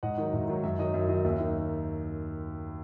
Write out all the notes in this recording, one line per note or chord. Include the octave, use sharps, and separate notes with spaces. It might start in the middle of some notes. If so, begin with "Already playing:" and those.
G#2 D#5 F#5
D#3 F#3
G#2 E5
D#3 F#3
F#2 E5
D#3 F#3 D#5
F#2 E5
D#3 F#3 D#5
D#2 E5
D#3